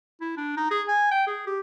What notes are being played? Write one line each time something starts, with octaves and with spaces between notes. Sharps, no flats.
E4
D4
D#4
G#4
G#5
G5
G#4
G4